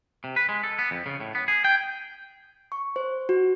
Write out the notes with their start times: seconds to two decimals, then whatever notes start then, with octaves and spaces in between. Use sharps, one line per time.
0.24 C3
0.36 B4
0.49 G#3
0.63 A4
0.79 B3
0.91 F2
1.06 C#3
1.20 A2
1.35 B3
1.48 G#4
1.64 G5
2.72 C#6
2.96 C5
3.29 F#4